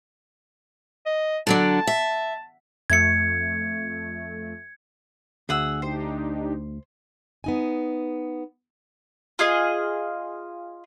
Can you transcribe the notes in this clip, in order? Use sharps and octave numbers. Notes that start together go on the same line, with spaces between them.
D#5
D3 F#3 D4 A5
E5
F2 A3 G#6 C#7
D2 G#4 F#5 E6
D4 D#4 G4 C5
B3 D#4 G#5
F4 G#4 D#5